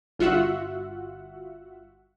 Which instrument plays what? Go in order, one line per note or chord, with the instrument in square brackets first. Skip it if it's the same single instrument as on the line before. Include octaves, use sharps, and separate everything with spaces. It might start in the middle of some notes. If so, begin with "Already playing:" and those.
[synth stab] G1 F4 F#4 E5 F#5